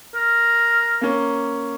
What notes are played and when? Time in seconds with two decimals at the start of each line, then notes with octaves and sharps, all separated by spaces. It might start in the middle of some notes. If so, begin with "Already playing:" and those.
0.15 A#4
1.01 A#3 C#4